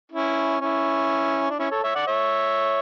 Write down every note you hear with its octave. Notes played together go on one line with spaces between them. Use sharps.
C#4 E4
C#4 E4
D4
C#4 E4
A4 C#5
C#5 E5
D5 F#5
C#5 E5